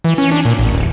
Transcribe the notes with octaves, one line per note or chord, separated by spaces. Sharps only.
E3
C#4
D4
A#2
A1
D1